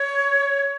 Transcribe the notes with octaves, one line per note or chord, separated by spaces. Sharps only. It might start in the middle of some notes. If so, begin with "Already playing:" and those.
Already playing: C#5